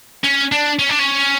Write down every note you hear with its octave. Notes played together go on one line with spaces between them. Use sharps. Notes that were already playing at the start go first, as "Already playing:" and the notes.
C#4
D4
C#4
D4
C#4